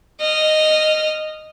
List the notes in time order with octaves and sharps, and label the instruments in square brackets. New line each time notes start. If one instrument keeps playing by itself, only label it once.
[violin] D#5 F6